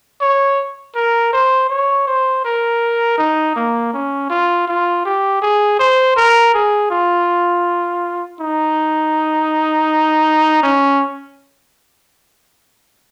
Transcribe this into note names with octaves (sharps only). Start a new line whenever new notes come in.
C#5
A#4
C5
C#5
C5
A#4
D#4
A#3
C#4
F4
F4
G4
G#4
C5
A#4
G#4
F4
D#4
C#4